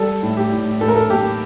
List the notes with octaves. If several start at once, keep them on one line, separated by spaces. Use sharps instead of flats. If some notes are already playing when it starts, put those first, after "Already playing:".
Already playing: G3 A4
A2
G4
A2
A2 A4
A#4
A4
A#3 G4